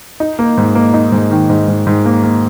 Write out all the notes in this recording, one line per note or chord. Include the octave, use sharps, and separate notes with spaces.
D#4
A#3
G#2
A#3
D#4
G#2
D#3
G#2
G#2
G#2
A#3
A#3